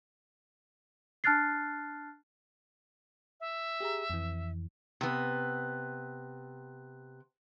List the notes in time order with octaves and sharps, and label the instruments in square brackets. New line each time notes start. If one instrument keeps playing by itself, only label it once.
[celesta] D4 A5 F6 F#6 A6 C7
[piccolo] E5
[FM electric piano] G4 G#4 A#5
F2 E3
[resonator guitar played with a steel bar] C3 B3